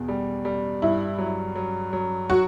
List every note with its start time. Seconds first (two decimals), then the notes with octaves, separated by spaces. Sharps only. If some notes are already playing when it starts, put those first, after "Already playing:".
Already playing: E2 B2
0.08 G3
0.45 G3
0.82 G2 E4
1.18 F#3
1.56 F#3
1.93 F#3
2.29 F#3 F#4